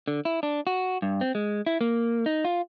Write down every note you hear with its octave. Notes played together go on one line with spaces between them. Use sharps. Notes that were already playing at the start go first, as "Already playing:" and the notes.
D3
E4
D4
F#4
G2
C4
G#3
E4
A#3
D#4
F4